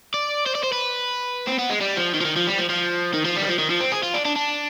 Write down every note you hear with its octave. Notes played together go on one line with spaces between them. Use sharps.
D5
C5
D5
C5
B4
C4
B3
G#3
G3
F3
D#3
F3
D#3
F3
G3
F3
F3
D#3
F3
G3
D#3
F3
D#3
F3
C4
G#4
F4
D4
D4
D4